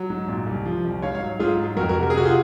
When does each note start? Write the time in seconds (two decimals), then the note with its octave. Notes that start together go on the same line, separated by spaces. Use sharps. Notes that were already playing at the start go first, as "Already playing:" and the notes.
Already playing: F#3
0.10 G#2
0.28 A#2
0.46 C2
0.65 F3
0.84 C2
1.02 G#2 C#5 F5
1.15 C#5 F5
1.21 F#3
1.40 G#2 F4 G#4
1.59 F#3
1.77 F2 F#4 A#4
1.89 F#4 A#4
1.96 C3
2.03 A#4
2.10 G#4
2.14 C3 F#4
2.25 F4 G#4